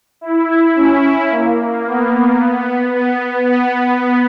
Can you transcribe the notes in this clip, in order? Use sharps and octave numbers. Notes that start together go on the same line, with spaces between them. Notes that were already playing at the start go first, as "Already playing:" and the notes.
E4
C#4
A#3
B3
B3
B3